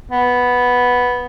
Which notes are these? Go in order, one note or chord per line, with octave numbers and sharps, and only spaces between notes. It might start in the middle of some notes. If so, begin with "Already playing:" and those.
B3